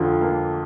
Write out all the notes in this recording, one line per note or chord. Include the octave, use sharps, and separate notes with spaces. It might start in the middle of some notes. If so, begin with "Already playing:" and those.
Already playing: F2 D3 F3
A#3